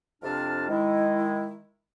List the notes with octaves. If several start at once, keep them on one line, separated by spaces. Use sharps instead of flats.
F2 C3 D4 F4 A5 F6
D#3 G#3 E4